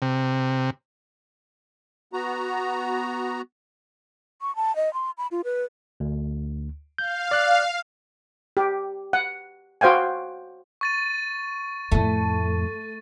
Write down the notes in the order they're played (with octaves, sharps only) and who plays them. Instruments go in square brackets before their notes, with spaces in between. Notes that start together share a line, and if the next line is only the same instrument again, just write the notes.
[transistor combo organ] C3
[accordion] B3 F#4 A#5
[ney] C#6
A5
D#5
C6
B5
F4
B4
[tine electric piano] D2
[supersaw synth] F5 [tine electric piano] G6
[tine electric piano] D5 F#6
[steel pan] G4
F#5
F#4 C5 F5 G5 G#5
[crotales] C#6 A6 D#7
[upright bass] F2 A2 [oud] A3